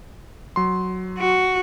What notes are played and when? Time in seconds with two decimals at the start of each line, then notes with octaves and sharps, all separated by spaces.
0.56 F#3 C6
1.19 F#4